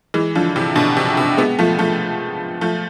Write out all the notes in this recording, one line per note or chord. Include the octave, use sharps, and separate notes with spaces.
E3 G#3
D3 F3
C3 E3
B2 D3
C3
C3
G#3 B3
F3 A3
F3 A3
F3 A3